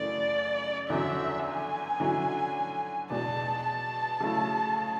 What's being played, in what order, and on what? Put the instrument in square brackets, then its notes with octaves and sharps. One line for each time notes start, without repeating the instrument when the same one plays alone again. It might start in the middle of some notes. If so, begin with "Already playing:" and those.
Already playing: [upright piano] F#2 C#3 E3 A3 [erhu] D5
[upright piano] E2 D3 F#3 C#4 [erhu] E5
[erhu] G#5
[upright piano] D3 F#3 C#4 E4
[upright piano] E2 B2 G#3 D4 [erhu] A5
[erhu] A5
[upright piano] C#3 F#3 A3 E4